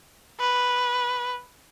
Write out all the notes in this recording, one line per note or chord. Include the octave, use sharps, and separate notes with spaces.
B4